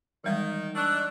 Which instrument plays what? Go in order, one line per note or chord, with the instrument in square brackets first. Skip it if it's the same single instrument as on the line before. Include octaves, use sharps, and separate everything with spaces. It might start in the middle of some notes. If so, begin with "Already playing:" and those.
[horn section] D#3 [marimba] E3 G3 G#3
[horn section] D4 D#4 [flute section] C#6 E6 F#6